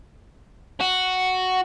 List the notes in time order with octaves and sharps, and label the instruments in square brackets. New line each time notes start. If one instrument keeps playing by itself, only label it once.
[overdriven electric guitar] F#4